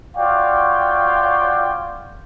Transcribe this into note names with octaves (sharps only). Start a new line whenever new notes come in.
F4 F#4 C#5 D5 F5 G5